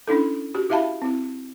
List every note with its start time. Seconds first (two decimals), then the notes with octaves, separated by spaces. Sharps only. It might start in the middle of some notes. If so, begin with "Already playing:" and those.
0.07 C#4 D4 E4 A4
0.55 F#4 G4
0.70 E4 G4 E5 F5 A5 B5
1.02 C4 E4